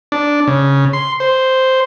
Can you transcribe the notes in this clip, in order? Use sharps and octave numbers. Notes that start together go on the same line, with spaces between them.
D4
C#3
C6
C5